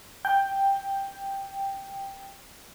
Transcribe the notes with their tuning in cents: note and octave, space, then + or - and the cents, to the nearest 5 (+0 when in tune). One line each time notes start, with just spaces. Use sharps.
G5 +5